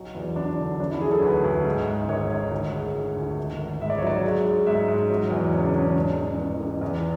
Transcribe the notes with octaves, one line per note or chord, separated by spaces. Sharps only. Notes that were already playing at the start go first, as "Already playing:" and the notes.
Already playing: B1 F#3
E2
E2 D4
D3
F#3 D4
E4
F#3 G#4
A4
D2 B4
D2
G#2
G#2
G#1 C#5
G#1
D2
G#3
D2
D2
G#1
G#1
G#2 E5
D5
C#5
F#3 D5
G#3
G#3
G#2 E5
G#2
F#3
E2
C#3 C#5
D4
E1 C#4
C#4
G#2 D4
A1
A1
A1
E2